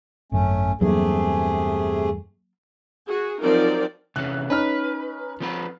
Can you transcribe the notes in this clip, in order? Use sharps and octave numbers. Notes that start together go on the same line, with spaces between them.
G#1 F#2 A3 C#4
E2 G2 C3 F#3 A3 A#3 G#4
F#4 G#4
F3 F#3 C4 D#4 A#4 D5
C3 E3 C#4 F#6
C#4 D#4 B4 F6
F3 C4 B4